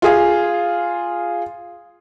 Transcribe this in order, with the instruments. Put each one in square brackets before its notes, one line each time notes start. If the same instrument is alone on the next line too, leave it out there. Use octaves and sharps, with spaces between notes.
[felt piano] F4 G#4 F5